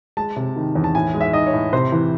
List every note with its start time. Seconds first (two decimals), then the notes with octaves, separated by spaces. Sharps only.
0.17 G#3 A5
0.36 C3
0.56 D#3
0.75 E2
0.84 A5
0.95 A2 G#5
1.14 G#3
1.21 E5
1.33 D#4 D#5
1.47 C#5
1.53 A2
1.73 C3 C5
1.92 E3